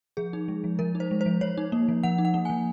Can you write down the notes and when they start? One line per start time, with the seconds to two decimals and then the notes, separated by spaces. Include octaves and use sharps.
0.17 F3 G#4
0.33 D#4
0.48 G#3
0.64 F3
0.79 F3 A#4
0.95 D#4
1.00 C5
1.11 G#3
1.21 C5
1.26 F3
1.41 F3 C#5
1.57 D#4
1.72 A#3
1.89 F3
2.03 F3 F#5
2.18 D#4
2.25 F#5
2.34 A#3
2.45 F3 G#5